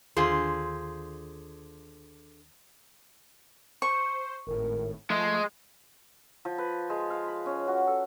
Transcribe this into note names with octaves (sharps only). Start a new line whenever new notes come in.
D#2 D3 F4 G#4 C5
C5 C#6
G#1 A2 A#4
F3 G#3 A3 C6
F3
B4
G#3
F5
B5
C#4
F#4
A4